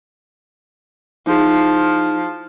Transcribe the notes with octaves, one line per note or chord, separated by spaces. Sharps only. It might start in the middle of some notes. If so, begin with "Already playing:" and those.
F3 D#4 E4 G#4